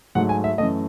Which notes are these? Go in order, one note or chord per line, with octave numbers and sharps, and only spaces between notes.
G#2 F#3 A3 F#5
G#5
E5
F#2 E3 A3 D#5